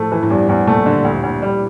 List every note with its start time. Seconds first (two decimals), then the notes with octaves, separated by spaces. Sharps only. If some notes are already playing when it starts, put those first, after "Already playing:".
Already playing: A2 F3 A3
0.12 E3
0.23 A2
0.30 E2 G2
0.49 E2 A2
0.67 A#2 A3
0.86 D3
1.05 D2
1.23 D2
1.42 G3